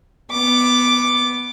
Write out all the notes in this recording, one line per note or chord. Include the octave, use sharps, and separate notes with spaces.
B3 D6